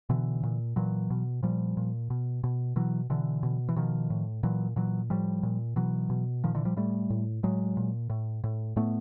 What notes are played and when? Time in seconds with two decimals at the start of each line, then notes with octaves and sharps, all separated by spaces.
0.10 B2 D3 E3
0.43 A#2
0.76 A#2 E3 F#3
1.10 B2
1.43 A#2 F3 G3
1.77 A#2
2.10 B2
2.44 B2
2.76 B2 E3 F#3
3.10 B2 D3 E3
3.43 B2
3.69 E3
3.76 B2 D#3 F3
4.10 A2
4.43 A#2 E3 F#3
4.76 A#2 E3 F#3
5.10 A2 F3 G3
5.43 A#2
5.76 B2 E3 F#3
6.10 B2
6.44 A#2 D#3 F3
6.55 D3 E3
6.65 F3 G3
6.76 A2 G3 A3
7.10 A2
7.43 A2 F#3 G#3
7.77 A#2
8.10 A2
8.44 A2
8.76 A2 A3 B3